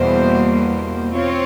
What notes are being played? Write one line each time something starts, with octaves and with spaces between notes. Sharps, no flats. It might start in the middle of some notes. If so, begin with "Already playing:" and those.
Already playing: E2 B2 G3 A#3 C5
C4 F4 C#5